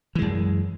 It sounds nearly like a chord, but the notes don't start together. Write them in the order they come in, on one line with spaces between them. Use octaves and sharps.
E3 G#3 F#2